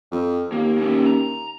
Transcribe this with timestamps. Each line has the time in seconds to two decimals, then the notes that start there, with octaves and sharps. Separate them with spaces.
0.12 F2
0.52 D#2 A#3
0.78 A#3 C#4
1.06 A#5